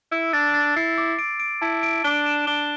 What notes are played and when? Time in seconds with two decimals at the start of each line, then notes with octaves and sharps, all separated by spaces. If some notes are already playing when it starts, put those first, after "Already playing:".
0.11 E4 E6
0.33 D4 A6
0.54 A6
0.76 E4 C7
0.98 D6
1.19 D7
1.40 D7
1.62 E4 A5
1.83 D7
2.04 D4 G7
2.26 E7
2.47 D4 G7